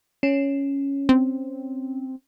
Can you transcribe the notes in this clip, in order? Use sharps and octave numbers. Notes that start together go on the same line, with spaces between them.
C#4
C4